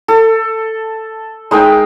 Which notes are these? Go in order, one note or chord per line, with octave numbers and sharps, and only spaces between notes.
A4
G#3 D#4 A#4 G5